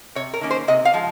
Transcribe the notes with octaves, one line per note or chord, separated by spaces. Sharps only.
C3 C#5
A#4
D#3 A#3 C#4
C5
C3 D#5
F5
F3 G#3